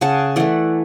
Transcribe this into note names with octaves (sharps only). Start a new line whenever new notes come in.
C#3 F#5 A5
E3 A3 D5 F#5